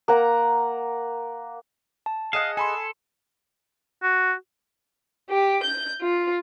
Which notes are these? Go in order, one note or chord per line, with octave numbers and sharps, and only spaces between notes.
A#3 F#5 A#5
A5
G#4 D#5 F5 F#5 E7
A4 G#5 B5 C6
F#4
G4
G6
F4